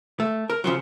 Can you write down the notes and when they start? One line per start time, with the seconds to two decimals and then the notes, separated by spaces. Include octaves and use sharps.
0.20 A3
0.50 A#4
0.64 C#3 F3 F#3